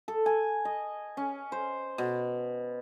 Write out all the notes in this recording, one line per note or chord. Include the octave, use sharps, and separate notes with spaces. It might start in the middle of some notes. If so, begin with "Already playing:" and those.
A4
G#5
D#5
C#4
C5
B2